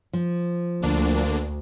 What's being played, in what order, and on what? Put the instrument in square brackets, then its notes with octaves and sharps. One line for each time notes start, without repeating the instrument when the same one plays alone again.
[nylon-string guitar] F3
[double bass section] D2 [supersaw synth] D3 A#3 D4